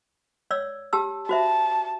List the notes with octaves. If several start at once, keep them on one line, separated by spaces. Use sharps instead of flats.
C#5 D5 E6
G4 A5 E6
F#4 C5 E5 A5